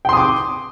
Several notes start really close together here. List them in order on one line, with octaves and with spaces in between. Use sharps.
G5 C6 D#6 D6